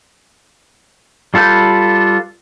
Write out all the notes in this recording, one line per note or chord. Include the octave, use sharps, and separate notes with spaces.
G3 F4 A4 B4 G6